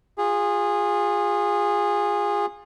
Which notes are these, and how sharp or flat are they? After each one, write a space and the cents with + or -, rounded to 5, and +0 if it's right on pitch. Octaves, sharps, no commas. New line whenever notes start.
F4 +20 G#4 -20